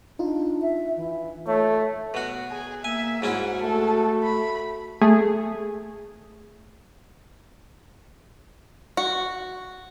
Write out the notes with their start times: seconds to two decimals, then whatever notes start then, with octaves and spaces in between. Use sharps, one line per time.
0.19 D4 D#4 F4
0.62 E5
0.97 E3
1.47 A3 C#5
2.14 B2 F#4
2.51 G#4
2.84 A#3 E5 G#5
3.22 G#2 C#4 E4 F#4 F#5
3.63 A3 A4
4.24 B5
5.01 A3 G#4
8.97 F#4